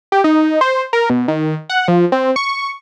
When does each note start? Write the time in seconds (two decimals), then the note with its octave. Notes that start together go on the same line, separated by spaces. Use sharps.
0.12 G4
0.24 D#4
0.61 C5
0.93 A#4
1.10 B2
1.28 D#3
1.69 F#5
1.88 F3
2.12 C4
2.36 C#6